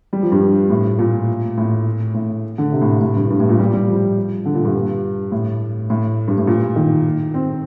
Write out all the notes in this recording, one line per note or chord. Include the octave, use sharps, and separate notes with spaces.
G3
F3
G2
A2
A#2
A2
A2
D3
C3
A2
A2
G2
G2
A2
A#2
G3
G3
F3
D3
A#2
G2
A2
A2
G2
A2
A#2
D#3
C4